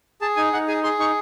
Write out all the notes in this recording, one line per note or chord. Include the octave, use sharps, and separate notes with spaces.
G#4 A5
D#4 G#5
D#4 F#5
G#4 G#5
G#4 C6
D#4 C#6